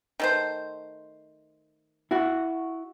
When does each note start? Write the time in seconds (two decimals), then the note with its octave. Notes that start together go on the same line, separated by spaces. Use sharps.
0.20 D#3 A3 C5
2.11 E4 F#4